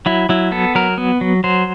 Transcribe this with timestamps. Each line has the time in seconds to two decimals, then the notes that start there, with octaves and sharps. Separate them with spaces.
0.06 F#3 E4
0.29 F#3 E4
0.52 B3 A4
0.75 F#3 A#4
0.98 B3
1.21 F#3
1.44 F#3 C5